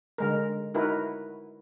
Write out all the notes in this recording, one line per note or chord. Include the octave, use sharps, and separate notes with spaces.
D3 G#3 A#4
D#4 E4 F#4 A#4 B4